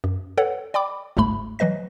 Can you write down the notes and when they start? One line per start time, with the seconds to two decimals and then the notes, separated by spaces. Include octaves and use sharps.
0.04 F#2
0.37 A4 B4 C#5 F#5
0.74 D5 G5 B5 D6
1.17 G1 C#2 G#2 A3 B5
1.59 E3 F#3 B4 D#5 A#6